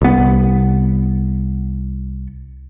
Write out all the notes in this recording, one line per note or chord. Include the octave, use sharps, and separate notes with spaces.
C2 B3